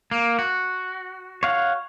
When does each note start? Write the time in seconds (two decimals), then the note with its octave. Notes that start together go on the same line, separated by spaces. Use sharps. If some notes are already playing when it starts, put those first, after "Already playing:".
0.11 A#3
0.39 F#4
1.43 C#5 F5 F#5